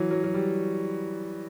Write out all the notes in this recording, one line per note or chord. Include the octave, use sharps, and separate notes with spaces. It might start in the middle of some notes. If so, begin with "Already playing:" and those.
Already playing: E3 F#3
F#3
F#3
G3